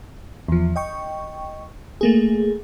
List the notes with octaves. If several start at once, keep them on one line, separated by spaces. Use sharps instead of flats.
E2 F3
D#5 G5 C#6
A3 A#3 G#4